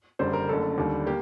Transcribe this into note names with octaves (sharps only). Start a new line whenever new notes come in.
F#1 F#2 D3 G3 C5
A#4
F#1 F#2 D3 A3 A4
D#2 D3 G3
A#3 G4